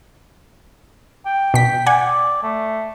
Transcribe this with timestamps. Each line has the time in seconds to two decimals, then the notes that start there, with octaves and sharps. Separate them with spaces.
1.26 G5
1.54 B2 B6
1.86 D5 F#5 G#5
2.43 A3